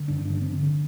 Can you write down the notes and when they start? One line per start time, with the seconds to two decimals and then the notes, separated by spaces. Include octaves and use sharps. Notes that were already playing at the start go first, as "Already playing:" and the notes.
Already playing: D3
0.08 G2 D4
0.25 D4
0.30 D3
0.41 C4
0.53 D3